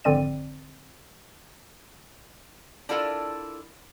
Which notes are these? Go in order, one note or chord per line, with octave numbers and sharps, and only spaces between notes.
G#1 F2 D3 C4 D5 D#7
D4 E4 F4 A4 A#4 D5